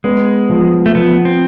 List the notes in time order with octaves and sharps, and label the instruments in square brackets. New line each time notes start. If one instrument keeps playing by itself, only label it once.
[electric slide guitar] G#3 [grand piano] B3
[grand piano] F3
[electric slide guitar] A3
[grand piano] F3 [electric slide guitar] B3
[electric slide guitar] C4